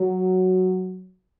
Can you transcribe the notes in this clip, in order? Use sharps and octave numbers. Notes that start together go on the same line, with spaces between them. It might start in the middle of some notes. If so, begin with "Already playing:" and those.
Already playing: F#3